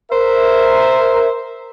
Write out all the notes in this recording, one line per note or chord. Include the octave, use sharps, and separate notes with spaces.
A#4 C5 E5